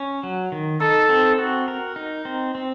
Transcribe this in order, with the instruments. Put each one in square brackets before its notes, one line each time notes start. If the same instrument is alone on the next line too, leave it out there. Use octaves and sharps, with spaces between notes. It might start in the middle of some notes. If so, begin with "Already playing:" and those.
Already playing: [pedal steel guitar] C#4
F#3
D#3
[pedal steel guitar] D#4 [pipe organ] A4
[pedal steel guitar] C4
F#4
A#4
D#4
C4
C4